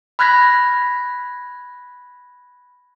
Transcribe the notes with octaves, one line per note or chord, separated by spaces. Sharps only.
B5 F6 F#6 G#6 A#6 B6